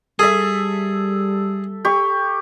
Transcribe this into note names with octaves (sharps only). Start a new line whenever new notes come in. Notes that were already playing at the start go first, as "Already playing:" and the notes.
G3 G#4 A4 E5
G4 C#6